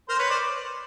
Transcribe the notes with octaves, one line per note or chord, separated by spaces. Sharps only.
A#4 C5
B4 C#5
C5 D5